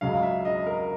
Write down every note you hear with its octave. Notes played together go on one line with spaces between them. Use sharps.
C#2 C#3 F#3 F5
E5
D#5
A#4